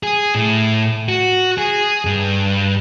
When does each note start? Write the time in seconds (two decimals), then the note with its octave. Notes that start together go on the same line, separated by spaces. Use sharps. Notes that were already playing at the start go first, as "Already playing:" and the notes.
0.03 G#4
0.35 A2
1.09 F#4
1.58 G#4
2.05 G2